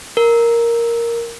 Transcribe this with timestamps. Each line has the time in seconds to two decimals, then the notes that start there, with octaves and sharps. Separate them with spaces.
0.17 A#4